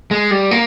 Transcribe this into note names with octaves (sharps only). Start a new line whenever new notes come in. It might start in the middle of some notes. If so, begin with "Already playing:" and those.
G#3
G3
A#3